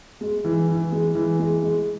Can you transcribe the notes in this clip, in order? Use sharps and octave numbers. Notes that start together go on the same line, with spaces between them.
G#3
E3
E3
G#3
E3
G#3
G#3